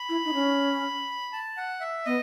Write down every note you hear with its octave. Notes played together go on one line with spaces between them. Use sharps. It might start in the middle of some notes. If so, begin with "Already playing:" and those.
Already playing: B5
E4
D#4
C#4
A5
F#5
E5
B3 D#5